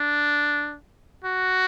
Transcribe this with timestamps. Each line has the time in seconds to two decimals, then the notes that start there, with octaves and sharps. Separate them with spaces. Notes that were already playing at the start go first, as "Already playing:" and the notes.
Already playing: D4
1.24 F#4